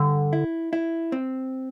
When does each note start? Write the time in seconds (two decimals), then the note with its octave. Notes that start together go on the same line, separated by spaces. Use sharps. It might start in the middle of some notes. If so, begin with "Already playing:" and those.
Already playing: G2 D3
0.33 E4
0.73 E4
1.12 C4